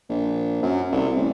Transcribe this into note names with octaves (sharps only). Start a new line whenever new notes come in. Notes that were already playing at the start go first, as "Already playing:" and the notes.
A#1
F#2
C2
A1